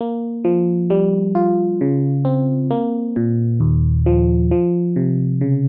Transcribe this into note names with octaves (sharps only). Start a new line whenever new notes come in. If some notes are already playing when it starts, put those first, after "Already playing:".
A#3
F3
G3
F4
C#3
C4
A#3
A#2
D#2
F3
F3
C3
C#3